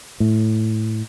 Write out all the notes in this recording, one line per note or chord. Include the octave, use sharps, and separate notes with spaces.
A2